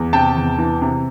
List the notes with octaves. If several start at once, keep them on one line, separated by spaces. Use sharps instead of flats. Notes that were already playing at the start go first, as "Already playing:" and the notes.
Already playing: E2
C3 G5 A5
E2
E3
C3